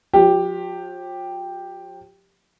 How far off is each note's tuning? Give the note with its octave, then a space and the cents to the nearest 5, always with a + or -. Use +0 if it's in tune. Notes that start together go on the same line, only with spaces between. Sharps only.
F3 +45 G4 +0